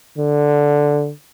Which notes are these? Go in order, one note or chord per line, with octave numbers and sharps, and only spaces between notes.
D3